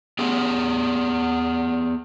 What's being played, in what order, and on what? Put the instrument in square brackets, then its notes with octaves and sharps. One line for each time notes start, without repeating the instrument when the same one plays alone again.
[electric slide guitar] B3 G4 G#4